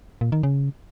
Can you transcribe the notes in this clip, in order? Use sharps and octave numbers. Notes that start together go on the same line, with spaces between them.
A#2
D#3
C#3